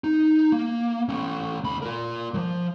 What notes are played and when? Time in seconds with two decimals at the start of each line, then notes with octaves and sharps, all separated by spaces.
0.04 D#4
0.52 A#3
1.09 A3 C#4
1.64 D#2 B5
1.82 F4 A#4
2.34 F3 F#3